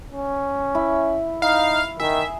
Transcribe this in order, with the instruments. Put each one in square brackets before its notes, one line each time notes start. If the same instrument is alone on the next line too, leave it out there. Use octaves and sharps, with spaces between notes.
[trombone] C#4
[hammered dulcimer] E4
[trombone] D#4 [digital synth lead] F5
[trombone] D#3 [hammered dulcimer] G#4 [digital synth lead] E5